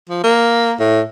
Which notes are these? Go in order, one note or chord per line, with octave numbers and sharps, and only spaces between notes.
F3
A#3
A2